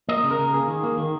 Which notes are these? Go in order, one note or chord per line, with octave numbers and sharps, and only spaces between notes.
A#3 D#5
C#3
A#4
C#3
A#3 G#4
D#3
A#3
D#3